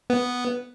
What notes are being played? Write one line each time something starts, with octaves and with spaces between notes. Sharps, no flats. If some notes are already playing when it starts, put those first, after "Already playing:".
B3